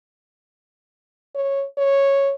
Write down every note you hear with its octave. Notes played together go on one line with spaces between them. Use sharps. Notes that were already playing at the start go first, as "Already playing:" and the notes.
C#5
C#5